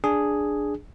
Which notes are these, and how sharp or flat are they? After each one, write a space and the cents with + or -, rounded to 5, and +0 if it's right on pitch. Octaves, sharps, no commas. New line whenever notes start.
D4 +0 G#4 +0